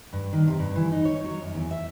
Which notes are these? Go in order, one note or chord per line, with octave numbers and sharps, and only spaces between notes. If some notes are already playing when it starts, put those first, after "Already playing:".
G2
D#3
C3
G2
E3
D#4
C#5
F#3
F#2
E2
E5